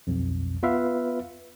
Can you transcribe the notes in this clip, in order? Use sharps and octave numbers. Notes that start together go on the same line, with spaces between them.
B1 F2
B3 F4 B4 E5 F5